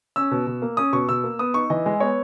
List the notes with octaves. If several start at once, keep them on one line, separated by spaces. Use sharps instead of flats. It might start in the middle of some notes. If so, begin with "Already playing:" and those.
C#4 E6
B2
B2
A#3
C#4 D#6
B2 C#6
B2 E6
A#3
B3 D#6
D#4 C#6
E3 D#5
G#3
B3 C#5